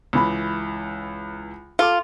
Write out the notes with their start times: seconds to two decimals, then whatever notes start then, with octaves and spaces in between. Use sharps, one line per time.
0.13 C#2 E3 B5
1.79 F4 A4 D6